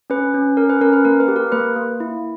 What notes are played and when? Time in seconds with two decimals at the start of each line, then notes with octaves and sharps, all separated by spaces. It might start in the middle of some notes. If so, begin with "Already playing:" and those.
0.10 C#4 B4
0.34 C#4
0.57 C#4 A#4
0.70 B4
0.81 C#4 A#4
0.93 B4
1.05 A#3 A#4
1.20 B4
1.28 G4
1.36 A#4
1.52 A#3 B4
1.76 A#3
2.00 E4